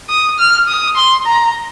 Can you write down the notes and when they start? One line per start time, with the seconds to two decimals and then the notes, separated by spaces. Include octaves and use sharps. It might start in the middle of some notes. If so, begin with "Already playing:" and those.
0.09 D#6
0.39 F6
0.68 D#6
0.96 C6
1.26 A#5